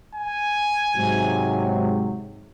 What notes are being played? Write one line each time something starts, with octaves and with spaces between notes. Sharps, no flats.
G#5
G#2 C3 F#3